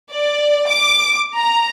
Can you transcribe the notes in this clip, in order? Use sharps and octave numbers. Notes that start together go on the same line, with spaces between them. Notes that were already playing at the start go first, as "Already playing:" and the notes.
D5
D6
A#5